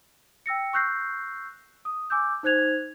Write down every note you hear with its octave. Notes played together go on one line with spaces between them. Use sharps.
G5 E6 A#6 C#7
C#6 E6 F#6 G6 A#6 C7
D#6
G#5 D6 E6 G6
D#4 C5 F#6 G#6 F7